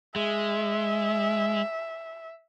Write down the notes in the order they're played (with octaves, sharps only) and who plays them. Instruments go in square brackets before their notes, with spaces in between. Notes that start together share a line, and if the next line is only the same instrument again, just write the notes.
[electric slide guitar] G#3 [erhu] E5